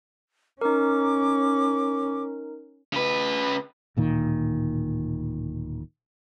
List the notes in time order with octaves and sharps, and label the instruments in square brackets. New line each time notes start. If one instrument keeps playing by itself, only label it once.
[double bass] C#4 [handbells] D#4 A#4 [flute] D6
[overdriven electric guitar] C#3 B4
[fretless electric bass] D1 A#2 D#3